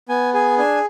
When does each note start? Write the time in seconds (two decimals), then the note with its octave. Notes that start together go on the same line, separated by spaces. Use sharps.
0.09 B3 G#5
0.34 G#4 G#5
0.58 D4 G#5